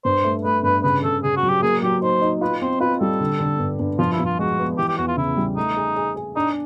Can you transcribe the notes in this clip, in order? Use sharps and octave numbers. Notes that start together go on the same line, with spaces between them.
G2 C5
A3
A3 B4
G2 B4
C#3 B4
C#3 A4
C#3 G#4
F#4
F#3
G4
A#3 G#4
F#3 G4
D#4 C5
D#4
F4 B4
C4 C5
F4 B4
G3 A4
D3
D3
G2
G2
F3 F4
E4
F3
F4
G#3 F#4
B3
E3 G4
G4
E2 F#4
F4
C#3 E4
G3
A3 D#4
G#4
G#4
G#4
D4 D#4